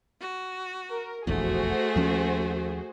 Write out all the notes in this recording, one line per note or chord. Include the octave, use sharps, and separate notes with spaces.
F#4
A#4
F1 A#1 E2 A3 F#4 G#4 C5
D#2 F3 C#4